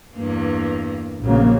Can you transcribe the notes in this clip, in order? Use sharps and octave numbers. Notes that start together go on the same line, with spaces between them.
E2 G2 A#3
A#1 C#3 F#3 A#3